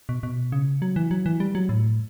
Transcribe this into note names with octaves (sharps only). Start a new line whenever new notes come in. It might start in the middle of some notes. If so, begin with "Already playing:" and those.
B2
B2
C#3
F#3
E3
F#3
E3
G3
F#3
A2